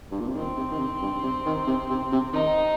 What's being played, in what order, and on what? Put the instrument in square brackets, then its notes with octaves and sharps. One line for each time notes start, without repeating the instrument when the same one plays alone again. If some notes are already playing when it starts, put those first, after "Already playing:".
[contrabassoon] G2
A#2
C3
[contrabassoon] D#3 [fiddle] C4
[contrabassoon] C3
D#3
C3
G2
C3
D#3
C3
C3
C3
[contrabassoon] D#3 [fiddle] D#4